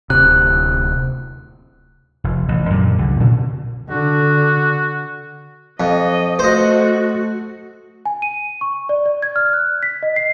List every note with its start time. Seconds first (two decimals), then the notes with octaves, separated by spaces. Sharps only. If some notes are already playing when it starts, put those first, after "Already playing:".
0.10 D1 C3 F#6
2.24 F1
2.48 A1
2.70 F#2 A#2 D3
2.98 C2 D3
3.20 A#2 D3 C#4
3.90 D3 F#4
5.80 F2 D#5
6.39 A3 F#4 C5 D#5
8.06 G#5
8.22 D#7
8.61 C#6
8.89 D5
9.06 D5
9.22 G#6
9.36 F6
9.53 F#6
9.83 B6
10.03 D#5
10.16 C7